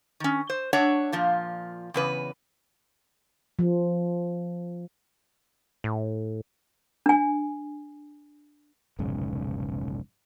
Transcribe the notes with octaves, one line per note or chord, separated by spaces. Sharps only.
D#3 C#4
C5
D4 C#5 E5 F#5
A#2 F3 F4
E2 C#3 B4
F3
A2
D4 G#5
F1 B1 G#2 C#3